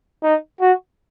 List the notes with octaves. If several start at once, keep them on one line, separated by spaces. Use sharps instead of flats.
D#4
F#4